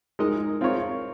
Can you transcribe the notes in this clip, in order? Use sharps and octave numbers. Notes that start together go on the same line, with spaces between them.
G#3 D#4 A#4 D#5
C4 F4 A#4 C#5